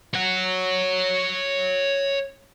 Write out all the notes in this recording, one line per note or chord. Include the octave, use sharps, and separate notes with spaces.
C#5 F#5